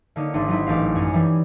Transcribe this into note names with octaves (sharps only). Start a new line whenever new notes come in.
D3 A#3 D#4 C#5
G#1 D4 D#4 F#5 C6
F#3 D#4 E4
A1 G4 F5
F#2 C#5 G#5
E3 G3